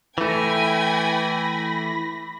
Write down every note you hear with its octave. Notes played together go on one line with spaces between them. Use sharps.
E3 A3 G5 G#5 B5 A#6